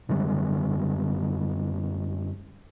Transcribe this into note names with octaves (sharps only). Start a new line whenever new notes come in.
F#2 D3 G3 G#3